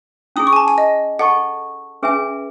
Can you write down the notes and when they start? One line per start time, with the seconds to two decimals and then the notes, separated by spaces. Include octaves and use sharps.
0.36 C#4 E4 G#4 D#6
0.47 C#6
0.53 G#5
0.56 A5
0.68 G#5
0.78 D#5
1.19 A4 D#5 F#5 A5 C#6
2.03 C#4 G#4 B4 E5 G#5